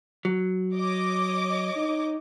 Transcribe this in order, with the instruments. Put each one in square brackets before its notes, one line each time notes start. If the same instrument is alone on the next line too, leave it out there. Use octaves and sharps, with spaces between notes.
[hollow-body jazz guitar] F#3
[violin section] C#5 D#5 D6
[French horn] D#4